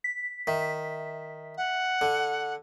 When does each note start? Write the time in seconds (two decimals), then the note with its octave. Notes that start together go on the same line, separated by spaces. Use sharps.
0.04 B6
0.47 D#3 E5 B6
1.57 F#5
2.01 D3